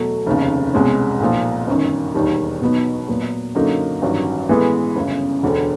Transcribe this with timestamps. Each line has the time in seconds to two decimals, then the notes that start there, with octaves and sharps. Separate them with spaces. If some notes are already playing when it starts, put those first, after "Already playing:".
Already playing: E2 B2 F#3 A3
0.26 F1 D#2 C#3
0.74 C2 B2 G#3 C#4
1.20 B1 A#2 F3
1.67 G1 F#2 D#3
2.14 E1 D#2 D#3 G3
2.61 B2 F#3 B3 D#4
3.08 A#2 F#3 B3
3.55 F#2 D3 F#3 A#3 D#4
4.02 A1 G2 D#3 F#3
4.49 A2 E3 G#3 B3
4.96 G1 F#2 C#3
5.43 E1 D2 D3